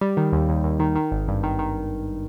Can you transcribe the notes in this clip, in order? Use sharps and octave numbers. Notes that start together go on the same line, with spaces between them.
G3
D#3
D#2
D#2
D#2
D#3
D#3
G#1
G2
D#3
D#3